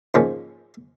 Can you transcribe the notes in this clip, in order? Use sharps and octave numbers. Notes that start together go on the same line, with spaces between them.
G#2 F3 A#3 C#4